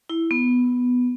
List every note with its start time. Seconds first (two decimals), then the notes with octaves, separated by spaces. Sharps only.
0.10 E4
0.31 B3